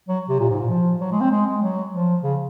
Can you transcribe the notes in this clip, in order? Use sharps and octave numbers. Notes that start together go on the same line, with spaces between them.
F#3
C3
A#2
G#2
A#2
F3
F#3
G#3
C4
G#3
G#3
F#3
F3
C#3